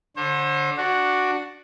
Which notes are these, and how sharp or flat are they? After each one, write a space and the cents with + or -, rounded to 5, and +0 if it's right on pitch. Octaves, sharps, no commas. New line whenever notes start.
D3 -5 C5 +40
D4 +0 F#4 +0